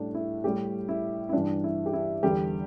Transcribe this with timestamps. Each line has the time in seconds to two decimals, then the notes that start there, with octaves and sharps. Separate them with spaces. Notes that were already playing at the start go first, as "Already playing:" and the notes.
Already playing: A2 G3 D4
0.15 E4
0.44 A2 G3 G4
0.89 E4
1.29 E4
1.33 G2 E3 G3 D4
1.64 E4
1.86 G4
1.93 E4
2.23 E2 D3 G3 G4